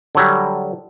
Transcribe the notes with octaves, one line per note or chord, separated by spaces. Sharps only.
D3 F#3 G3